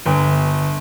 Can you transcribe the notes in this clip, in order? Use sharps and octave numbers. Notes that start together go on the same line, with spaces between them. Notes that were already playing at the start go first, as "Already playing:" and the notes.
G1